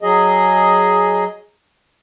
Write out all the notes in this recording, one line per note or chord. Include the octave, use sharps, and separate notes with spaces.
F#3 G#4 D#5